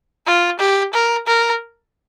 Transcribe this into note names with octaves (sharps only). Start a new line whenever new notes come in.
F4
G4
A#4
A#4